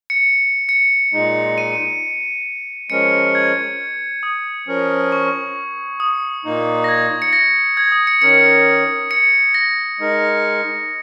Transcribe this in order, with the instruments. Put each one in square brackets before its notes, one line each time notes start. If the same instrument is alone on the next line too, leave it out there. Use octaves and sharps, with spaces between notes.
[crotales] C#7
C#7
[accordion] A#2 G#3 D#4
[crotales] D#7
[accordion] F3 G#3 C#4 A#4 [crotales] C#7
[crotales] G#6
D#6
[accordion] F3 C#4 A#4
[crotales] C#6
D#6
[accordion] A#2 A#3 D#4
[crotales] A#6
G#6
C#7
A#6
G#6
D#6
C#7
[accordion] D#3 C#4 A#4 [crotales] C#7
[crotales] C#7
A#6
[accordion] G#3 D#4 A#4